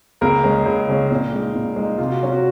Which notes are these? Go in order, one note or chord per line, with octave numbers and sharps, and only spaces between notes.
C#2 A#3 A#4
C#3 G#3 C#4
C#2
C#3 G#3 C#4
A#2
G#3 D#4
A#2
G#3
D#4
C3 F4
F#4
F#3 C#4
F#4